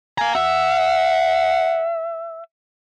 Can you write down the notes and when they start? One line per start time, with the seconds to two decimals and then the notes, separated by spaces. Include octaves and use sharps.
0.18 F5 G#5 A#5
0.35 E5 F#5